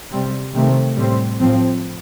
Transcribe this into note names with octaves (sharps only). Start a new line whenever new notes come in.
C3 G3 C4
C3 D#3 A3 C4
A2 G3 C4
A2 F3 C4